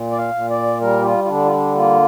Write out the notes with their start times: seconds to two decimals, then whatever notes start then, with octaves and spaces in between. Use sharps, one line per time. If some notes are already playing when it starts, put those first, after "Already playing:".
Already playing: A#2
0.12 D5
0.18 F5
0.34 A#2
0.50 D5
0.81 G3 A#4
1.01 G4
1.05 F4
1.24 F4
1.28 D3 D4
1.45 F4
1.52 D4
1.75 A#3 F4